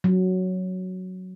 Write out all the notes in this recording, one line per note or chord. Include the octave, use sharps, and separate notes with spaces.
F#3